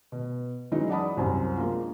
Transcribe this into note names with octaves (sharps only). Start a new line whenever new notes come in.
B2
E3 F#3 G#3 C#4 D#4
D5 F#5 A5 B5 D#6
C2 F#2 C4 C5
G#3 A#3 D4 F4